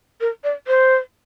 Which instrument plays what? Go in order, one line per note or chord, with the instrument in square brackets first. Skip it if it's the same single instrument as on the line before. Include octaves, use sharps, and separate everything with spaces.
[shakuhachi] A#4
D5
C5